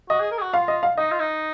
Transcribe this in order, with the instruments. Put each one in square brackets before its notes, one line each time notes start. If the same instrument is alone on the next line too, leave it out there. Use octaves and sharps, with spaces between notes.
[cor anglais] F#4 [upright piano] D#5
[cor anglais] G#4
A#4
G#4
F#4
[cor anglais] F4 [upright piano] F5
[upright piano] D#5
F5
[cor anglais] D#4 [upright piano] D#5
[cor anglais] F4
D#4